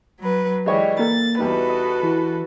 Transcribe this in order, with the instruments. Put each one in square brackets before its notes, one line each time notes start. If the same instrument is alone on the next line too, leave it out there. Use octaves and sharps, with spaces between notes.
[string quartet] F#3 B4
[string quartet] E3 G3 [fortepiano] G#3 C#5 D#5
[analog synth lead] A#3 [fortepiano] A4 A#4 [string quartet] A6
[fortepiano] E2 G3 D#4 [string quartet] F#4 A4 B4
[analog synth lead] D#5
E3